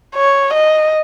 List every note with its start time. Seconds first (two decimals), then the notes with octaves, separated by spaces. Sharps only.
0.16 C#5
0.54 D#5